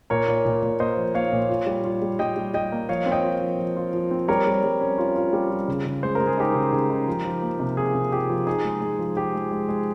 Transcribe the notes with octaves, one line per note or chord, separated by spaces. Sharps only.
A#2 A#4 C#5
A#2
A#2
A#2
A#3 C5 D#5
F3
A#3 C#5 F5
A#2
F4
G3
F4
G3
G3 D#5 G5
G3
G3 D#5 G5
A#3
F3 C#5 F5
C4
D#5 G5
F4
F3
F3
F4
F3
C4
G3 A#4 C#5
G3
G3
C#4
F4
F4
G3
F4
C#3
C#3
G#3 C5
A#4
G#3
G#4
D#4 G4 A#4
C#3
C#3
D#4
F3
F3
A#3
C3
F4 G#4
C3
F4 G4
F3
D#4 G#4
G#3
G#3
F3
F3 G4
G#3
G#3
G#3